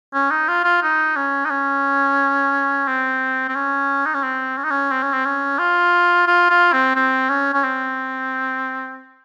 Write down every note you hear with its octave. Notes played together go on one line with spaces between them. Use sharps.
C#4
D#4
F4
F4
D#4
C#4
D#4
C#4
C4
C4
C#4
D#4
C#4
C4
C#4
D#4
C#4
C4
C#4
C4
C#4
F4
F4
F4
C4
C4
C#4
C#4
C4